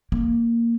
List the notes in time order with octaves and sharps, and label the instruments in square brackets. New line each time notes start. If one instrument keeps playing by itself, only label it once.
[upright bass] A#3